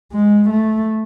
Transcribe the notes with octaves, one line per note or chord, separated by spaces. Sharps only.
G#3
A3